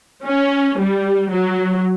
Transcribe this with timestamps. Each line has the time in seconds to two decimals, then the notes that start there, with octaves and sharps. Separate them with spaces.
0.27 C#4
0.80 G3
1.32 F#3